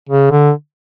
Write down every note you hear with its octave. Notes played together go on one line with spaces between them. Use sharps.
C#3
D3